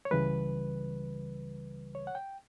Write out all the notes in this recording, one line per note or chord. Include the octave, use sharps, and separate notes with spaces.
C#5
C#2 C#3 E3 G3 B4
C#5
F#5
G5